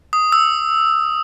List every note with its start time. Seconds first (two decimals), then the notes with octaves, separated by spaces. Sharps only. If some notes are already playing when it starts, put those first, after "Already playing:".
0.13 D#6
0.32 E6